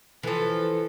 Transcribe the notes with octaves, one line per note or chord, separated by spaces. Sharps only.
E3 F3 A4